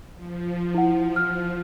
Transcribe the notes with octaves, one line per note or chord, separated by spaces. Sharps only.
F3
E4 F#5
F6